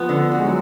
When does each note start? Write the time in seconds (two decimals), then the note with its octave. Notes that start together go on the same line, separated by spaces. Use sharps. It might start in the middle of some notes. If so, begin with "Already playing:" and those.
Already playing: F3 B3
0.09 D3
0.31 F#4
0.39 G#3
0.45 F#3